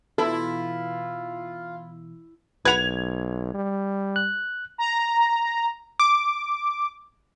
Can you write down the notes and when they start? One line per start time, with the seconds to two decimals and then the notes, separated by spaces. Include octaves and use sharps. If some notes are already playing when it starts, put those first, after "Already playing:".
0.18 B2 E3 E4 F4 A4
2.65 B1 B4 F#5 B5 G#6 F7
3.54 G3
4.16 F#6
4.78 A#5
6.00 D6